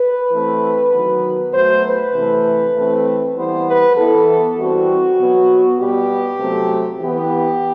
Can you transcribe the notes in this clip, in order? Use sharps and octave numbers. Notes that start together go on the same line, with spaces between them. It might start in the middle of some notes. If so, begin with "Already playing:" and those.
Already playing: B4
E3 A3 C4
D#3 F#3 B3
B2 F#3 A3 C5
B4
C3 E3 A3
E3 A3 C4
E3 G3 B3 C5
B4
E3 B3 A4
E3 G3 C4 F#4
B2 F#3 B3
B2 G3 B3 G4
C3 F#3 A3 C4
E3 B3 G4